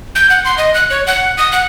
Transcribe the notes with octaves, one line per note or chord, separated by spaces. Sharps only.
G6
F#5
C6
D#5
F#6
C#5
F#5
D#6
F#5